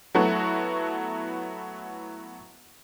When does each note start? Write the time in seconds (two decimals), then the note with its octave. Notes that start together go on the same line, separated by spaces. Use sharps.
0.15 F#3 A3 B3 E4 F#4